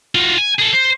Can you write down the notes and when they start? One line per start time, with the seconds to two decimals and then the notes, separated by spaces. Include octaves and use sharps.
0.15 F4 F#4
0.38 G#5
0.59 G#4 A4
0.73 C5